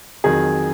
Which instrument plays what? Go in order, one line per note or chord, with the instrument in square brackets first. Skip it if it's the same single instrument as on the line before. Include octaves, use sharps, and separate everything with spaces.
[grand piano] F2 D#3 F#3 G#4